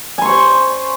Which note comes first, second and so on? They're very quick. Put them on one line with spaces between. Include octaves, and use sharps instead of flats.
G#5 C6 C#6 C5